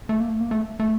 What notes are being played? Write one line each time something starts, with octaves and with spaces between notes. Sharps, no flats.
A3
A#3
A3
A#3
A3
A3